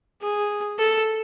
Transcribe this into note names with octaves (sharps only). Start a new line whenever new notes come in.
G#4
A4